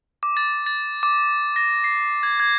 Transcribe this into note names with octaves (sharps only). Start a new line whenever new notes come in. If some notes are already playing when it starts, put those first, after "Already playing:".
D6
A6
A6
D6
A#6
C7
G#6
G#6